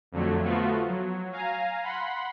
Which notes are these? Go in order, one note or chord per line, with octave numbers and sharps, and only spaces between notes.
F2 D3 F#3 A3
F3 A3 B3 F4 F#4
F#3
F5 G#5 A#5
F#5 B5 C6